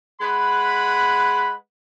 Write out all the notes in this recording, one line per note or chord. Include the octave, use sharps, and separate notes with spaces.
G#3 B4 F#5 B5